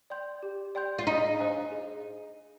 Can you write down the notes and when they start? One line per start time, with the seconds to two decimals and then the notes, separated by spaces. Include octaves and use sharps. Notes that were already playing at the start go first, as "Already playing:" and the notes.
0.10 D5 G5 C6 G6
0.43 G4
0.75 D5 G5 C6 G6
0.98 F4
1.07 D#4 G#4
1.40 C5 F5 G#5
1.72 G#4